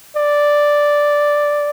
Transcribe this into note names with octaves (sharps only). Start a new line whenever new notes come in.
D5